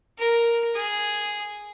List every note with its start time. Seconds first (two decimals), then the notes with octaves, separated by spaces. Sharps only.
0.19 A#4
0.75 G#4